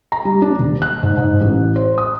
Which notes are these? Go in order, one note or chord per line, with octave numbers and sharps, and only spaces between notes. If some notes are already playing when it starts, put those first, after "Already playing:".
A#5
G3
D4
D#1
F#6
G#2
G#2
A1
C5
D#6